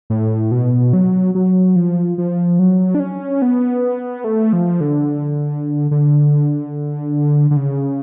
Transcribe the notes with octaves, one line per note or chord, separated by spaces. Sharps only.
A2
B2
F#3
F#3
F3
F3
F#3
D4
C#4
B3
A3
F3
D3
D3
D3
C#3